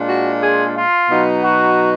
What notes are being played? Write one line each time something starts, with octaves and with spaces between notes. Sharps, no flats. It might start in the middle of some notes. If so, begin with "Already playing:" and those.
Already playing: A#2 G#3 D4 F4
F#4
G#4
F4
B2 F#3 B3 D#4
F#4